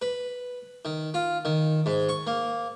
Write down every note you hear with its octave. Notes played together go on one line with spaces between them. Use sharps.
B4
D#3
F4
D#3
G#2
C#6
A#3